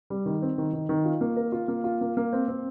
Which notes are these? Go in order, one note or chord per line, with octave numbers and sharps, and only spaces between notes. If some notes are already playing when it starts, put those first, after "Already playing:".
G3
D#3
C4
D#3
D#3
D#3
F4
A#3
A#4
F4
A#3
F4
A#3
A#3
C4
C4